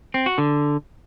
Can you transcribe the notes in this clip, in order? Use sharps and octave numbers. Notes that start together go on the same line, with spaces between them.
C4
F#4
D3